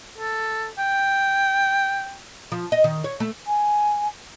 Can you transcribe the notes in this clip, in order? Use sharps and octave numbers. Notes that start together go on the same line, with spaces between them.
A4
G5
F3
D#5
D#3
C#5
A3
G#5